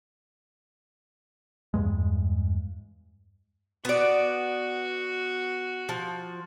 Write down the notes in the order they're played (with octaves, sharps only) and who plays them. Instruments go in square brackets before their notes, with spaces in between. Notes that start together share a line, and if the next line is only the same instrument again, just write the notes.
[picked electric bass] E2 G2 G#3
[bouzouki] B3 D5 [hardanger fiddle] F#4
[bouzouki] F3